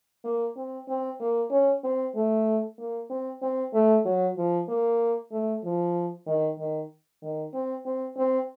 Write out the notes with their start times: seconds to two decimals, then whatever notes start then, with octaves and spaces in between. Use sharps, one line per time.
0.25 A#3
0.56 C4
0.88 C4
1.20 A#3
1.51 C#4
1.84 C4
2.15 A3
2.79 A#3
3.10 C4
3.42 C4
3.74 A3
4.05 F#3
4.37 F3
4.69 A#3
5.32 A3
5.64 F3
6.27 D#3
6.59 D#3
7.22 D#3
7.54 C4
7.86 C4
8.17 C4